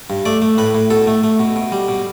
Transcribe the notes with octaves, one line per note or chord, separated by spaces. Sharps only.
G2
A3 D5
A3
A2 B4
A2
B2 A4
A3
A3
B2
B2
G3
B2